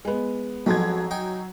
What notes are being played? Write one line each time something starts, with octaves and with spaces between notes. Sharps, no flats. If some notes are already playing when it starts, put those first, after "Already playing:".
G#3 B3
F2 G#2 F3 F#3 G#6
D#4 G5 G#5